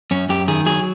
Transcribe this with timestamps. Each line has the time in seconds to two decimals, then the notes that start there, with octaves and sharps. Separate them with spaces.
0.11 F#2 C#4
0.29 F#2 G4
0.48 D#3 G#4
0.66 F#3 G#4